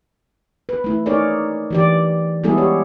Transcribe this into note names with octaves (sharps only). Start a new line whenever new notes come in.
B4
A3 E4
D#4 G#4 A#4 C#5 D5
E3 G4 D5
G3 G#3 B3 E4 G#4 A4
G4 C#5